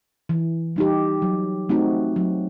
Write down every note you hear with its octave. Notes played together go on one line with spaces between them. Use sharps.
E3
G3 D#4 G4
F#3
A3 C4 D#4 F#4
F#3